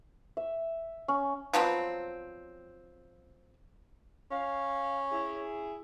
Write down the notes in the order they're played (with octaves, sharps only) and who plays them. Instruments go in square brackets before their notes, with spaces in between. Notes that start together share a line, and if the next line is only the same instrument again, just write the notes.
[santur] E5
C#4
[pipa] F3 F#3 B3 C4
[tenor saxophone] C#4 [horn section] F5
[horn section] E4 G#4